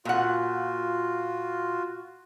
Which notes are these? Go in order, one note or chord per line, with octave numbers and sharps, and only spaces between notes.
A#2 F4 F#4 F#5